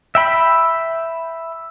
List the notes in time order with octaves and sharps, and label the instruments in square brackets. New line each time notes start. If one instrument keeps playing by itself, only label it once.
[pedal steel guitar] E5 G5 B5